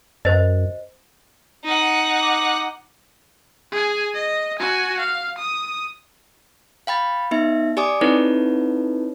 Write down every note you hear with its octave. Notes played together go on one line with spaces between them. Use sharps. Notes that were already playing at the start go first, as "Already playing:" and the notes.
F#2 C5 D#5
D#4 F#5
D6
G#4 G#5
D#5
F#4 G#5
F5
D#6
F5 G5 B5 A6
B3 D#4 E5
G4 D5 G#5 D6 D#6
C4 D#4 E4 A4 B4 C#5